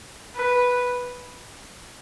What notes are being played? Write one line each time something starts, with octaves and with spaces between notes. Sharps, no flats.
B4